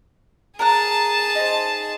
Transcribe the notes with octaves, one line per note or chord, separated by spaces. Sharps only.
G#4 A#4 A5 A#5 F#6
D#4 C5